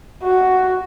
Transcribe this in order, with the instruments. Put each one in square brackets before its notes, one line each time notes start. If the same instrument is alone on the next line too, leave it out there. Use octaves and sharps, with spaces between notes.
[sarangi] F#4